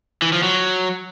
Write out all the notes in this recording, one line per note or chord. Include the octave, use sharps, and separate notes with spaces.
E3
F3
F#3